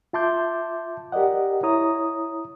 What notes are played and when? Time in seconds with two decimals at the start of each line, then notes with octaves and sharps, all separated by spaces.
0.13 F4 E5 A5 C6 D6 G6
1.12 G4 A#4 D5 D#5 F#5
1.63 E4 C#5 A#5 D#6